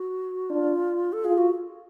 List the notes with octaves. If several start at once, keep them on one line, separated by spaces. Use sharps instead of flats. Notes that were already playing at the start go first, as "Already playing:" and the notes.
Already playing: F#4
D4 F4
A4
F4 G#4
F#4